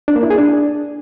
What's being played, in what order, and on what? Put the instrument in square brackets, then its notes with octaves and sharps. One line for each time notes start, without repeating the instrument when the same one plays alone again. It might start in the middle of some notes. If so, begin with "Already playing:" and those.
[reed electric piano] D4
A#3
E4
G#4
D4